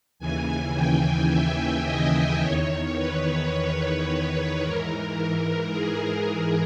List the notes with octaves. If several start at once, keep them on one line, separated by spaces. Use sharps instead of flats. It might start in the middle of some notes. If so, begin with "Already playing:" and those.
D#2 C#3 E3 G#5
G5
E5
D#5
E2 D#3 C#5
B4
G#2 E3 A#4
A#4
G#4
A#4